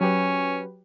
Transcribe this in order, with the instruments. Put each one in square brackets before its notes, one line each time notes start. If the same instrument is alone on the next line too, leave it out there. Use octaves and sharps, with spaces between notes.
[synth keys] F#3 G4 B4 [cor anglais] C#4